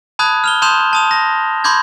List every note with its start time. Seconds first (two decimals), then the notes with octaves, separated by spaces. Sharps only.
0.19 A5 B5 D#6 F#6 G#6
0.44 F6 F7 G7
0.62 A5 C6 D#6 G6 E7 F7
0.93 A5 D#6 F7
1.11 A#6
1.64 B5 C6 D6 G6 G#6